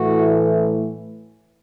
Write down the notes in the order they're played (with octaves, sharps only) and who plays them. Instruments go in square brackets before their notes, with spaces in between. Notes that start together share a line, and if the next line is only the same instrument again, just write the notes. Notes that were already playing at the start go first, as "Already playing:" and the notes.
Already playing: [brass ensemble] A2 E3 A3 F#4